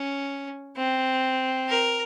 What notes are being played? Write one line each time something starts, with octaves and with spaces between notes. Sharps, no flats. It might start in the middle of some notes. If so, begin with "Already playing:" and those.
Already playing: C#4
C4
A#4